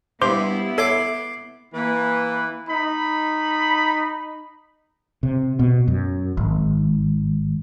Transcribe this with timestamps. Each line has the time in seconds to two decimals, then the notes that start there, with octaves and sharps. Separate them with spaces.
0.22 G2 B3 E4 C5 C6 D6
0.78 A4 C#5 E5 C6 D6
1.74 E3 A#3 B4
2.70 D#4 B5
5.23 C3
5.59 B2
5.88 F#2
6.37 G#1